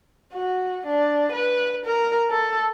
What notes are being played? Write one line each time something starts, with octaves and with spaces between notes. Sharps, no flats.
F#4
D4
B4
A#4
A4